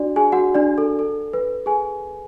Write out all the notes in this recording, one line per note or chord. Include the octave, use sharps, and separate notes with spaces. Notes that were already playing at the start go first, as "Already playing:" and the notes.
Already playing: D4 F#4 D5
G#4 G#5
F#4 F#5
D4 D5
A4
A4
B4
G#4 G#5